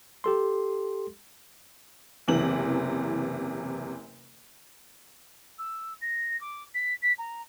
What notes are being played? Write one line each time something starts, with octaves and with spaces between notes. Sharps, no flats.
G4 A4 C6
F#1 E2 C3 E3 F#7
E6
A#6
D6
B6
B6
A#5